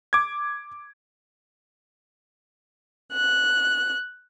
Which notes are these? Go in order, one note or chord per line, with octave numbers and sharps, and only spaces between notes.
D6 G#6
F#6